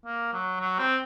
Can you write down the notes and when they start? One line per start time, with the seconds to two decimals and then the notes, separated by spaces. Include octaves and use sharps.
0.06 A#3
0.33 F#3
0.60 F#3
0.79 C4